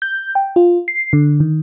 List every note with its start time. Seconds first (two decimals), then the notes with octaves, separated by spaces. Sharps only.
0.02 G6
0.35 G5
0.56 F4
0.88 C7
1.13 D3
1.40 D#3